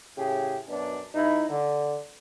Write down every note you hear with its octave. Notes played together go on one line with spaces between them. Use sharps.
A2 C#3 G4 G#4
F#2 B2 D4
G2 D#4 E4
D3